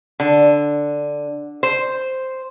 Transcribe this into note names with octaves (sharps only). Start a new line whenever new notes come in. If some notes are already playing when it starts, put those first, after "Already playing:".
D3
C5